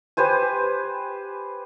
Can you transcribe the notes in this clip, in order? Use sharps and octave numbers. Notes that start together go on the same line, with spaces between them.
G4 B4 C5 G#5